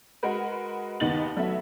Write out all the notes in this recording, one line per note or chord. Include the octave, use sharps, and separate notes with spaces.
G#3 F#4 A#4 B4
D#2 D#3 B3 D#4 A6 F#7
F#3 A3 B3 E5